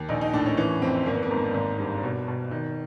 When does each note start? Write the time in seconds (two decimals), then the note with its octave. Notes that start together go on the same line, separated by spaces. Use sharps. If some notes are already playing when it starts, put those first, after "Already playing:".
Already playing: D#2
0.09 A#1 D#4
0.21 D#4
0.33 A2 D4
0.46 C#4
0.57 E3 C#4
0.82 F2 C4
1.06 G#1 A#3
1.14 B3
1.23 A#3
1.30 G#2
1.54 G#1
1.79 G2
2.03 B2
2.27 B2
2.51 D#3